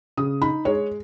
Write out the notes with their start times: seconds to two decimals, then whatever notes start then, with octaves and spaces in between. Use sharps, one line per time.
0.17 C#3 D#6
0.41 D#4 B5
0.65 G#3 C#5